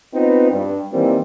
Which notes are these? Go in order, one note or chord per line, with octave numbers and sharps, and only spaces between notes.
B3 C4 D#4 F4 B4
G2
D#3 E3 G3 A#3 C4 E4